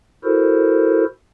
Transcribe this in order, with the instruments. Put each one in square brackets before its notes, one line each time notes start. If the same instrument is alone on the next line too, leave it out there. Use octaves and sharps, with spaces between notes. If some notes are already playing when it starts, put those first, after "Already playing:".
[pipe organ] E4 F#4 A4 A#4 C5